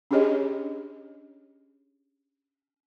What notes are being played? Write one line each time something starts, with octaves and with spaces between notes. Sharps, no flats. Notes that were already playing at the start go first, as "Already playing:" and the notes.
C#4 D4 G4 G#4 C#5 D#5